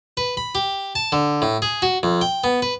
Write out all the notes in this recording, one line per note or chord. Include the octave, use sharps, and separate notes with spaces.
B4
B5
G4
A5
D3
A2
G#4
F#4
F2
G5
B3
B4